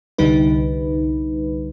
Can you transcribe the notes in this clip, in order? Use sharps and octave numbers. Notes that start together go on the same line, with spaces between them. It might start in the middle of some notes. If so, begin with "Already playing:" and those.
C2 D3 G3 D#4 B4